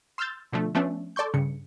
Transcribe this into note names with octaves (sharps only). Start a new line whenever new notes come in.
C6 E6 F6 G6 A6
B2 D3 F3 A3
F3 A3 B3 C#4 D4
A4 D5 C6 C#6 G6
G2 C#3 C#7